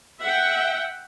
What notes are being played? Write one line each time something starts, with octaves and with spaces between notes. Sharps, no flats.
E5 F#5 G5